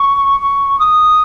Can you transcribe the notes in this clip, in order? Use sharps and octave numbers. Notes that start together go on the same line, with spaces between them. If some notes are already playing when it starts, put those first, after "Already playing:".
Already playing: C#6
C#6
D#6